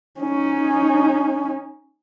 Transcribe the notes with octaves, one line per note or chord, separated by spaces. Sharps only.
C#4 D#4